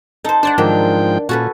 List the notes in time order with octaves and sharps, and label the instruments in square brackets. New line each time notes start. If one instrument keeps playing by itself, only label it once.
[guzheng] D#4 C5 [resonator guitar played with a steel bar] A4
[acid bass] D4 [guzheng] C5 D5 F#5
[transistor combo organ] G#2 F3 G5 [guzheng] D#3 [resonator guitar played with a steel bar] F#3
[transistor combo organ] A#2 [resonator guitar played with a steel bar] C#4 [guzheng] F#4 A4 B4